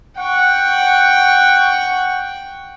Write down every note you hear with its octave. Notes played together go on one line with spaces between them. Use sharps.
F#5 G5 C#6